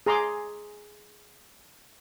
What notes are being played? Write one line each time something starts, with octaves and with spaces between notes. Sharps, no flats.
G#4 A#5 C6 D6